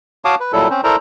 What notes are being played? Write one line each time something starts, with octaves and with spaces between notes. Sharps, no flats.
F#4 C#5 F5 A5 D6 D#6
B4
A#2 F#3 G3 E4 A4
C4 C#4 C5
E4 A4 A#4 C5 D5 A#5